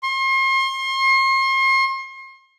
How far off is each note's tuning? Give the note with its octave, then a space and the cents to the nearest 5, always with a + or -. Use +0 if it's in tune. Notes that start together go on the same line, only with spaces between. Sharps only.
C6 +40